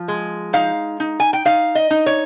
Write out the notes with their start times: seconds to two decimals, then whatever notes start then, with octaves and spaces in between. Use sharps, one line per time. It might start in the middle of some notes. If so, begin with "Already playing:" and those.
Already playing: F3
0.08 G#3
0.53 D#4 F5
1.00 D#4
1.20 G#5
1.33 G5
1.45 D#4 F5
1.75 D#5
1.90 D#4
2.06 C#5